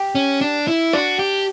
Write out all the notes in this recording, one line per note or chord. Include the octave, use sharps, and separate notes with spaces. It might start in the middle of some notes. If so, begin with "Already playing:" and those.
Already playing: G4
C#4
D4
E4
D4 F#4
G4